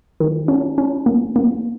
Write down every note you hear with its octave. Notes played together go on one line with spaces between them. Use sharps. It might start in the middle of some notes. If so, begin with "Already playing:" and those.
D#3
C#4
C#4
A#3
A#3